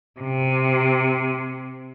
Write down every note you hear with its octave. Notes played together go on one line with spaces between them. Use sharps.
C3